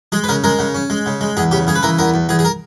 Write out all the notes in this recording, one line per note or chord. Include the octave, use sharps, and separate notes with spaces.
G#3 G#4
B4
C#3 A#4
G#3 A#4
C#3
C#4
G#3
C#3
G#3
E2 G#4
C#3 G4
C#3 G#4
B4
E3 A#4
E2 A#4
E2
E2 G#4
G#4
A#4